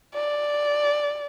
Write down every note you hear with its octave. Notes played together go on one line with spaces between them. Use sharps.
D5